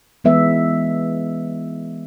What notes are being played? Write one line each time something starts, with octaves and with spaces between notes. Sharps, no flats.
E3 G#3 B3 E5